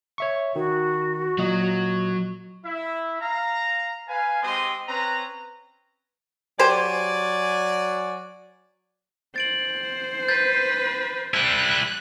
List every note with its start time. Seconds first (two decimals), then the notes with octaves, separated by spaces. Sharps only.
0.18 C#5 E5 C#6
0.56 D#3 F#4
1.38 A#2 F#3 D#5
2.65 E4 E5
3.21 F5 A#5
4.08 B4 F5 G#5
4.43 G#3 C4 G4 D#5 C6 D#6
4.88 C4 C#4 B4 A#5
6.59 F#3 F#4 G4 C5 D5 G#5
9.36 C5 A6 D7 F#7
10.28 B4 G6 A6 C7
11.34 G3 E4 F#6